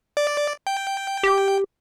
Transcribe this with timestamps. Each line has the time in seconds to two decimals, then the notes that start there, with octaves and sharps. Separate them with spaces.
0.17 D5
0.67 G5
1.23 G4